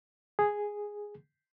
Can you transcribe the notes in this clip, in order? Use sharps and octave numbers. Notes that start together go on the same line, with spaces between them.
G#4